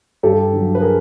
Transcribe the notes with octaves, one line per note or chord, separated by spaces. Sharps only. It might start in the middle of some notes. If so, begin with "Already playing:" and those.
G2 G4 A4
D3 F#3
B4
G#4 A#4